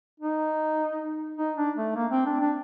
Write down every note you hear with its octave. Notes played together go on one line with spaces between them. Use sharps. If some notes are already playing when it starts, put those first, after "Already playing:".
D#4
D#4
D4
A3
A#3
C4
D4
D4